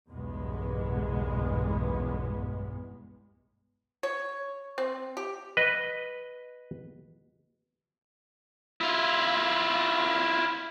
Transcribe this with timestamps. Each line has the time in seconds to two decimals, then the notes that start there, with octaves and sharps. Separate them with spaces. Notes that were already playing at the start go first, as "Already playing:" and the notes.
0.10 F#1 B1 E2 G2 G#3 B3
4.03 C#5
4.78 C4
5.17 G4
5.57 B4 D#5
8.81 E4 F4